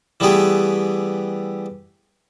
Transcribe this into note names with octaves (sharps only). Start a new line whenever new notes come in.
E3 G3 A3 B3 G4 G#4